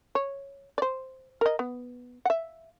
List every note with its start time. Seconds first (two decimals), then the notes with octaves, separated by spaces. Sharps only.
0.15 C#5
0.78 C5 D5
1.41 A#4 D#5
1.59 B3
2.25 E5 F#5